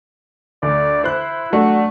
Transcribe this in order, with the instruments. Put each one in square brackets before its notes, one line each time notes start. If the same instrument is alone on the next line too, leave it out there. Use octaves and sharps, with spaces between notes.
[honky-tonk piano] D2 [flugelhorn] D5
[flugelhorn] E4 [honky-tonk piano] C5 F#6
[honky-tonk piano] F#3 A3 D4 [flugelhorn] F#4